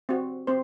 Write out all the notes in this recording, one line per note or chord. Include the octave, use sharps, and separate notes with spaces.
C4 F#4
C4 C5